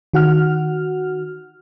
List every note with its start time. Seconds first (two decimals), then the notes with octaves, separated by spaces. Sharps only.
0.13 D#3 F#4 F#5 F6